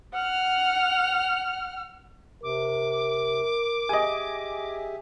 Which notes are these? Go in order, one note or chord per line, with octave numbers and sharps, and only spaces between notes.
F#5 F6
C3 A#4 D6
G4 G#4 D#5 E5 G#5